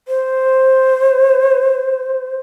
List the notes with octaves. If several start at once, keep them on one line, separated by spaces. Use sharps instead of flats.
C5